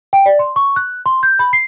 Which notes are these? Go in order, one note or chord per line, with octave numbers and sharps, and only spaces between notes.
G5
D5
C6
C#6
F#6
C6
G6
B5
C7